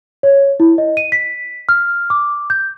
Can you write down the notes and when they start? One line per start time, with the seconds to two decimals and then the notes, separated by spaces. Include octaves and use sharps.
0.23 C#5
0.60 E4
0.78 D#5
0.97 D#7
1.12 B6
1.69 F6
2.10 D6
2.50 G6